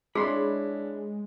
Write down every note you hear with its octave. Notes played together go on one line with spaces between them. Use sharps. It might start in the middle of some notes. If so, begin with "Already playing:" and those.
G#3 D4 E4 G#4 C#5 B5 C6